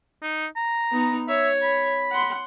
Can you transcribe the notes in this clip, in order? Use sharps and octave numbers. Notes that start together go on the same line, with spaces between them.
D#4
A#5
B3 D#4
C#5 E5
B5
F#5 C6